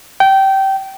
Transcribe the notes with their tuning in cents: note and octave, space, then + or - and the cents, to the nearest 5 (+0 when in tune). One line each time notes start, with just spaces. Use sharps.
G5 -20